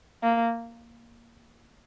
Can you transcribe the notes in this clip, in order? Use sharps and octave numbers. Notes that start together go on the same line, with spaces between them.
A#3